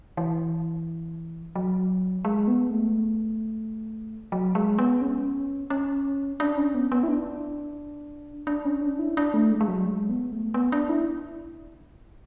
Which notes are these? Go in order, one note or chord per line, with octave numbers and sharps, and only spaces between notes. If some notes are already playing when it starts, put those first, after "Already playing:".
E3
F#3
G#3
B3
A3
F#3
G#3
B3
C#4
C#4
D4
C#4
B3
B3
E4
D4
D4
C#4
D4
E4
D4
A3
G#3
G#3
F#3
G#3
B3
A3
B3
D4
E4